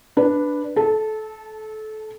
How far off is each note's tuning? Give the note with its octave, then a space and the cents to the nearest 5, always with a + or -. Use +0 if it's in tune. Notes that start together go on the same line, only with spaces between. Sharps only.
D4 +0 B4 +0
A4 -25 A5 +0